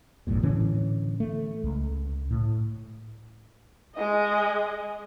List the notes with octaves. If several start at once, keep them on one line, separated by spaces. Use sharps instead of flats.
G#1 E2 G2 A#2
A2 D3 E3 C#4
A3
C#2
A2
G#3 D#5